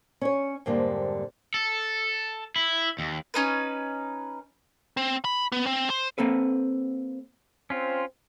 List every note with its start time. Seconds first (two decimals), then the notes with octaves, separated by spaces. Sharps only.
0.21 C#4 C#5
0.66 F2 G#2 D3 G3 A#3
1.54 A4
2.56 E4
2.99 D#2
3.34 C#4 D#4 B4
4.97 C4
5.25 B5
5.52 B3
5.66 C4
5.90 C5
6.18 A#3 C4 A4 B4
7.70 C4 C#4 F4